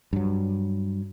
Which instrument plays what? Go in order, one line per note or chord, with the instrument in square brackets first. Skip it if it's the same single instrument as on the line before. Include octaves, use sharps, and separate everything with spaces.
[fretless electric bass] G2 F#3